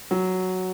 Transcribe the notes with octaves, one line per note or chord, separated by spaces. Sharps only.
F#3